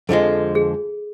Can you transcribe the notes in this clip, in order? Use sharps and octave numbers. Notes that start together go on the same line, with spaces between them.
F2 D3 F3 G#3 A4
G#4